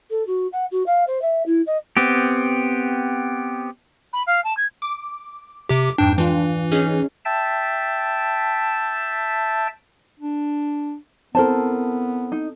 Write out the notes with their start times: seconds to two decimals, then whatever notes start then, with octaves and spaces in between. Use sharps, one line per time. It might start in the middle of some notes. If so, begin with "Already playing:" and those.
0.10 A4
0.26 F#4
0.52 F#5
0.71 F#4
0.86 F5
1.07 C5
1.21 E5
1.46 E4
1.66 D#5
1.97 B3 C4 G4
4.13 B5
4.27 F5
4.44 A5
4.57 G#6
4.82 D6
5.69 C3 G4 D6
5.98 F2 G#2 D4 G5
6.18 E3 D4 F4
6.72 C#4 D#4 G#4
7.25 E5 G5 A5
10.19 D4
11.35 B3 C4 E4 A4 A#4 C5 A5
12.32 D#4